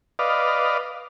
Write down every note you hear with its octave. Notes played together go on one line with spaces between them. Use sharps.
B4 D5 D#5 F5